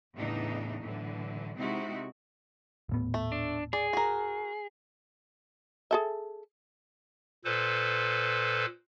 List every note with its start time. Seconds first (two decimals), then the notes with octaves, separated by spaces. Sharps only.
0.14 E2 A2 C#3 E3 D4 D#4
0.82 A2 D3 E3 F#3
1.58 C3 G#3 C4 D#4 E4 F#4
2.89 D#1 A2 B3
3.14 A3
3.32 D4
3.73 G#4 D5
3.93 F#4 A#4
5.91 G#4 A4 E5
7.45 A#2 A4 B4 C5